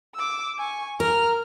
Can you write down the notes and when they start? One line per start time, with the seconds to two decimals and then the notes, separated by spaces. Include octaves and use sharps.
0.15 D6 E6
0.58 G#5 C#6
1.00 A#4 F6